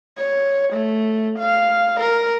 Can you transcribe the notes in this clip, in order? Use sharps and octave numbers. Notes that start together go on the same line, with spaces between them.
C#5
A3
F5
A#4